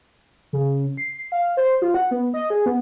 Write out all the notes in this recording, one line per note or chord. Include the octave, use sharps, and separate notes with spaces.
C#3
C7
F5
C5
F4
F#5
B3
D#5
G#4
B3